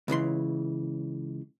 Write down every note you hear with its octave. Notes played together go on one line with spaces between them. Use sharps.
C#2 C#3 E3 C6